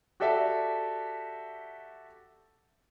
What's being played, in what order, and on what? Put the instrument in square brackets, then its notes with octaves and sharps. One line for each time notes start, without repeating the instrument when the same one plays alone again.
[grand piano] F#4 G4 A4 D5 E5